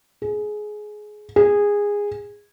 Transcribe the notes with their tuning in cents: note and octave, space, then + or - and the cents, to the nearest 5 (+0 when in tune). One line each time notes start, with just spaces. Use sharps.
G#4 +20
G#4 -15